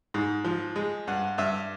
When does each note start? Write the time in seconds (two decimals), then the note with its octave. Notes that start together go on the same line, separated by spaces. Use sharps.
0.14 G#2
0.45 F3
0.76 G#3
1.07 G2 F#5
1.38 G2 E5